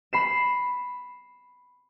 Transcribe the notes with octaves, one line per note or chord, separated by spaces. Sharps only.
B5 C7 E7